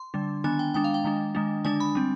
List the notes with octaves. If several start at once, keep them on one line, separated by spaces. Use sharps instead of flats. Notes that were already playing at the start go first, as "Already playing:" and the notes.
Already playing: C6
D3 G3 D4
D#3 B3 D4 G#5
G5
D#3 G#3 D4 G5
F5
G5
D#3 G#3 D4
D#3 G#3 D4
D3 G#3 D4 G#5
B5
G3 C4